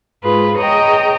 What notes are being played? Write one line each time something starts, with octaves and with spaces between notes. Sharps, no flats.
G#2 F4 G#4 B4
G#4 C#5 D#5 G5 A#5